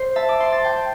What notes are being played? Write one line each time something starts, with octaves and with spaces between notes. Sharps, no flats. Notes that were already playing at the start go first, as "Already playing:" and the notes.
Already playing: C5
E5 A5
D6
C6
A5
G5 C6